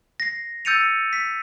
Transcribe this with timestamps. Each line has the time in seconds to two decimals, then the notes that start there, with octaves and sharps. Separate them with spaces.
0.20 A#6 C7
0.65 E6 G6 A6 C#7 D#7 F7
1.13 B6